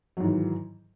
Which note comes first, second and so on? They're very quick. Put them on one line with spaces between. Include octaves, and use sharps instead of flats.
F#3 G#2 E3 D#3